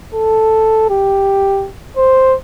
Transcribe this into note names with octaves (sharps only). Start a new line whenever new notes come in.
A4
G4
C5